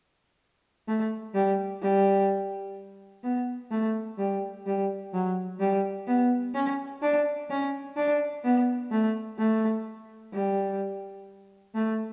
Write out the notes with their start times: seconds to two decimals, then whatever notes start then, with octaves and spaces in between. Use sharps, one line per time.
0.88 A3
1.34 G3
1.81 G3
3.23 B3
3.71 A3
4.18 G3
4.66 G3
5.13 F#3
5.60 G3
6.08 B3
6.54 C#4
7.02 D4
7.50 C#4
7.97 D4
8.44 B3
8.91 A3
9.38 A3
10.33 G3
11.75 A3